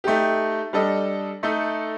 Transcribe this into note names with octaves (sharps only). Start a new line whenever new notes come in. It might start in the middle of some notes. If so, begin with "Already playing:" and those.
A3 D#4 G4
G3 D4 A4 D#5
A3 D#4 A4